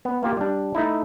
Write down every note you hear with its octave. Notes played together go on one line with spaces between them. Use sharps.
B3
A#3 F4 G4
G3 D4
A3 D#4 E4